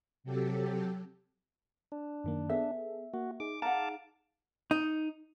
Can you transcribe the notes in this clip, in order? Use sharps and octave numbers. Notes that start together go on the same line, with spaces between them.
C3 F#3 G4 A4
D4
F#2 D#3 A#3
B3 G#4 A4 E5
A#3 F#4
D#4 G#4 D6
F5 F#5 A5 A#5 D6
D#4